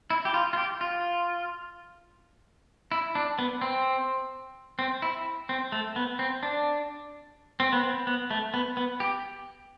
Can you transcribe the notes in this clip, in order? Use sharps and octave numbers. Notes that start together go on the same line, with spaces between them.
E4
G4
F4
F4
G4
F4
E4
D4
B3
C4
C4
E4
C4
A3
B3
C4
D4
C4
B3
C4
B3
A3
B3
B3
G4